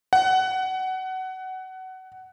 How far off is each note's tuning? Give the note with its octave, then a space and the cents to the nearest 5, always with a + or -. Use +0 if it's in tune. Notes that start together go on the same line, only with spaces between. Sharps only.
F#5 +20